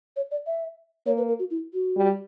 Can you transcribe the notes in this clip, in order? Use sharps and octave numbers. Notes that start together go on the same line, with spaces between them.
C#5
D5
E5
A#3 C#5
B4
A#4
F#4
E4
F#4
G3